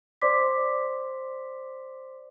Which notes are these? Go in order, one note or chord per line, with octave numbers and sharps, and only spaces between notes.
C5 D5 C6 D6 B6